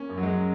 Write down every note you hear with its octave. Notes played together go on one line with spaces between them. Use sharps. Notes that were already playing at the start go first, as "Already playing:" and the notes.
Already playing: A#3 C#4
F#2
F#3
G#3
C#4